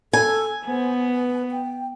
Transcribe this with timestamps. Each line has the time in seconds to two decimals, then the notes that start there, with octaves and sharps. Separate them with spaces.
0.13 A4 G#5
0.66 B3 C5
1.07 B4
1.52 G5